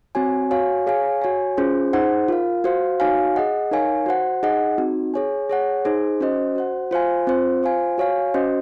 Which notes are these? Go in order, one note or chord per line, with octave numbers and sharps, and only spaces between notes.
C4 F#4 C#5 G#5
F#4 C#5 F5 G#5
G#4 C#5 F5 G#5
F#4 C#5 G#5
C#4 F4 G#4 C5
D#4 G#4 C5 F#5
F4 A#4 F5
F#4 C5 F5
D#4 F#4 C#5 F5 G#5
G#4 D#5 F#5
D#4 A#4 C#5 F5 G#5
F#4 C5 F#5
D#4 G#4 D#5 F#5
C4 D#4 F#4
G#4 C#5 G#5
G#4 C#5 F#5
D#4 G#4 C5
C#4 F#4 C5 D#5
F#4 C5 F#5
F4 C5 F5 G#5
C4 F4 C5
F4 C5 F5 G#5
F#4 C#5 F5 G#5
C#4 F#4 C5 D#5